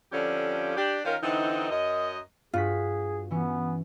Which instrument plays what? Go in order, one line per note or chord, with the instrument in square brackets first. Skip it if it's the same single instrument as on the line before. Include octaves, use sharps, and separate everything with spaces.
[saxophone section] F2 D3 F3 C#4 G4
D4 G4
D#3 C#4 F4 A#4
D3 E3 C4 D#4
F#2 D#5
[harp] G2 F#4 B6 [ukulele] F4 [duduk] G#4
[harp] E3 C#4 [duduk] B3